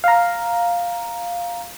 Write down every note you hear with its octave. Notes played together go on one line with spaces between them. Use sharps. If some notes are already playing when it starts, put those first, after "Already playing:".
F5 A#5